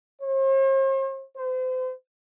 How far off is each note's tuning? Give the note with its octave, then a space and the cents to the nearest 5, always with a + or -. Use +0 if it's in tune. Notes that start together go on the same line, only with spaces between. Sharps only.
C5 +45
C5 -35